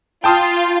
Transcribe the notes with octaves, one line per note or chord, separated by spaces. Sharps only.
F4 G5 A5 D#6